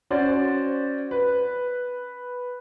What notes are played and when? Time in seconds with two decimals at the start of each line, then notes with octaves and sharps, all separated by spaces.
0.10 C#4 F#4 C5 D5
1.11 B4